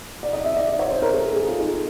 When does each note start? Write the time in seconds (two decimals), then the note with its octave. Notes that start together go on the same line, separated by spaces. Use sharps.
0.23 D5
0.33 D#5
0.45 E5
0.57 D5
0.67 D5
0.79 C#5
0.90 C5
1.02 A#4
1.14 A4
1.25 G#4
1.36 G#4
1.47 F4
1.59 D#4